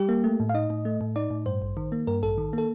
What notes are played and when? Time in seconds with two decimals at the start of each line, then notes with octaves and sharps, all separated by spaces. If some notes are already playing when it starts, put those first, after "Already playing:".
Already playing: G3 G4
0.09 A#3
0.24 A3
0.40 A2
0.49 F5
0.54 D#4 D#5
0.70 A2
0.85 A3
1.01 A2
1.16 D#4 D5
1.30 A2
1.46 G2 C5
1.62 A1
1.77 D#3
1.92 A#3
2.07 G2 A#4
2.23 A1 A4
2.38 D#3
2.53 A#3 A4